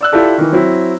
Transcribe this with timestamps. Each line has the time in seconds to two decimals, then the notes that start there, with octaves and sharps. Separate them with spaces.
0.01 D5 E6 F#6
0.12 E4 F4 G4 A4 D5
0.38 D#3 E3
0.52 F#3 C4 E4